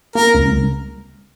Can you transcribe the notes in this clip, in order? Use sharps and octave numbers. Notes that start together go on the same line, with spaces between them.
A#3 A#4
C#2
C#2